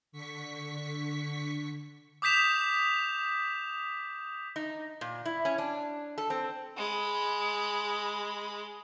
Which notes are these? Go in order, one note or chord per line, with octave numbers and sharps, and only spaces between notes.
D3 C#6 B6
D6 D#6 G6 B6 E7 F7
D#4
A#2
E4
C#4
D4
A4
C4
G#3 B5